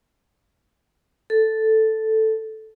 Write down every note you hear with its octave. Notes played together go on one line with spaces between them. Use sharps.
A4